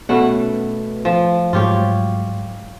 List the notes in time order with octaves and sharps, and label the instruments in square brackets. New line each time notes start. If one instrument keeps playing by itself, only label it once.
[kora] B2 A3 F#5 [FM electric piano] B3 C#4 B4
[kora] F3
[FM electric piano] G#2 F#3 G#3 [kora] F4 G4 C#5